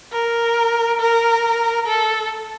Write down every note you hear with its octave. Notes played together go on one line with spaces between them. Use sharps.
A#4
A#4
A4